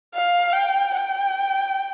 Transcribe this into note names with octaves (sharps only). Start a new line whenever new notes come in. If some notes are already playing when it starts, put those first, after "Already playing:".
F5
G5
G5